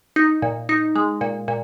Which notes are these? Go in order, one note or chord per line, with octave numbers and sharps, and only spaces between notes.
D#4
A#2
D#4
G#3
A#2
A#2